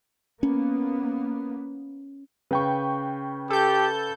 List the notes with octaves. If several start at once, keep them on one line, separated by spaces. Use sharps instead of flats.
A#3 B3 C#4
C#3 B4 G5 C#6
G4 A4 G6